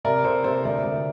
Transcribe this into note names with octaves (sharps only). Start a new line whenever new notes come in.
C3 A#4 D5
C3 A4 C5
C3 A4 C5
D2 A#4 D5
D2